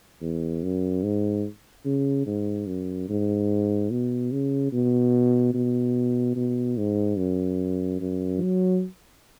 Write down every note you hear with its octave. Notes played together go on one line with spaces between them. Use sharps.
E2
F#2
G#2
C#3
G#2
F#2
G#2
B2
C#3
B2
B2
B2
G#2
F#2
F#2
F#3